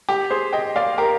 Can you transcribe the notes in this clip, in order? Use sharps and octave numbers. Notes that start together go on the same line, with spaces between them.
G4
G#4 C5
D#5 G5
D5 F5
G4 A#4